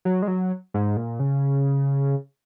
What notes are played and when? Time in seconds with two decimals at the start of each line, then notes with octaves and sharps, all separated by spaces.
0.05 F#3
0.22 G#3
0.28 F#3
0.74 G#2
0.97 A#2
1.20 C#3